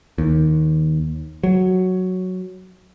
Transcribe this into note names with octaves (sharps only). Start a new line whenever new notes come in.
D#2
F#3